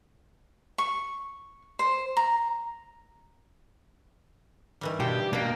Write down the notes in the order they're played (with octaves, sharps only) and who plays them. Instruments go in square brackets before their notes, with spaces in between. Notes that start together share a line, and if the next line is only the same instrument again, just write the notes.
[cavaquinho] C#6
C5
A#5
[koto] D#3 E3 G3
[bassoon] G2 [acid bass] B2 [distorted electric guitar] G4 [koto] C5
[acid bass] B2 [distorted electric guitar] A#3 [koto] D4 G5